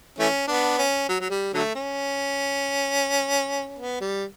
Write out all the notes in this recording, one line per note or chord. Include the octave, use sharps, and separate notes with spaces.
E3 A3 C#4
B3 D4
C#4
F#3
F#3
G3
D3 F#3 A3
C#4
B3
G3